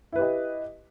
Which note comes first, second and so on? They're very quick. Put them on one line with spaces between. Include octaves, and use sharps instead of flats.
E4 B4 G4 D#5